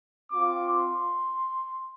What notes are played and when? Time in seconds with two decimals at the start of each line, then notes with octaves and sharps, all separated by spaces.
0.31 C4 F4 D6
0.69 C6